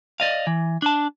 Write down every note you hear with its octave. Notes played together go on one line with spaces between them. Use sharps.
D5 D#5 F5
E3
D4 A5